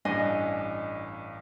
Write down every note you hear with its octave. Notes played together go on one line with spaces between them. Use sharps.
A1 G2 D4 D#5 G#5